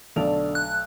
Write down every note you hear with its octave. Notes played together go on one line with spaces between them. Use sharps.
B1 D3 A3 D4 F7
F#6